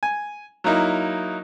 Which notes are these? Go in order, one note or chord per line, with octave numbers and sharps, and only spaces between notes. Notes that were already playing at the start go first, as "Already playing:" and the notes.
G#5
F#3 A#3 D#4 E4